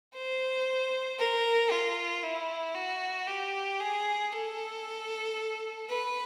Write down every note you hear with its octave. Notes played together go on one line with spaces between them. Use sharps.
C5
A#4
F4
E4
F#4
G4
G#4
A4
B4